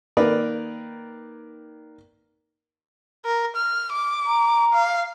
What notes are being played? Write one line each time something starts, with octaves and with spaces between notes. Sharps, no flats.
D#3 A#3 A#4 B4 D5
A#4
F6
D6
A#5
F5